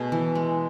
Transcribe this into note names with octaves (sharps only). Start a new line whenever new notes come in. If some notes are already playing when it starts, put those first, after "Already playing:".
Already playing: B2 A3 G#4
E3
G#3